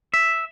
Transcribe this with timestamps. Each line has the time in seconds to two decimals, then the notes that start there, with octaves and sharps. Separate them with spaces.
0.14 E5